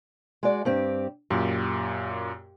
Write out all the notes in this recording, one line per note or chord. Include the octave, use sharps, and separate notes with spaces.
G#3 F#4 D5
G2 C4 G4
F#2 A#2 G4